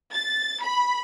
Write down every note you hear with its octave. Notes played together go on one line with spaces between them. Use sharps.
A6
B5